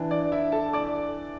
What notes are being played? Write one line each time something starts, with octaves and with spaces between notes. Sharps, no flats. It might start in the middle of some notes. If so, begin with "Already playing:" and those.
Already playing: E3 D4
D5
E4 E5
A4 A5
D5 D6